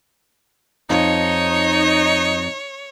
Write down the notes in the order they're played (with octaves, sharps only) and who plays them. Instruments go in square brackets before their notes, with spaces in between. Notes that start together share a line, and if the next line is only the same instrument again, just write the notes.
[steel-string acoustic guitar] F2 [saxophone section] D#4 [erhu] C#5